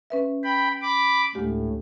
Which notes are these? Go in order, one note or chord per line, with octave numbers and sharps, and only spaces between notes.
C#4 B4 E5
G5 B5
B5 D6
D2 A2 G#3 G4